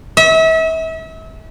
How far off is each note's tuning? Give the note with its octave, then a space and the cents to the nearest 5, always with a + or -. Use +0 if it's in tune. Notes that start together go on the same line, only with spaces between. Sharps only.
E5 -35